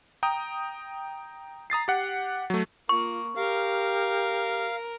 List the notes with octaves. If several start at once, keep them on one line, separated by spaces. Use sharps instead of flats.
G5 A#5 D#6
A#5 D#6 A6 C7
G4 F#5
F#3 A3
A#3 F4 C#6
G4 A#4 F5